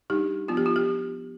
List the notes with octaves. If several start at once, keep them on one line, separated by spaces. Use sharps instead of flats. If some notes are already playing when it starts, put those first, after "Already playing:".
G3 D4 D#4 G4
F3 B3 D4 F4
G4
F4
G4